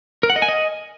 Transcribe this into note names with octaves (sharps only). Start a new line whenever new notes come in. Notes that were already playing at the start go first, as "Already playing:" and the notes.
A#4
F#5
D#5
G#5
D#5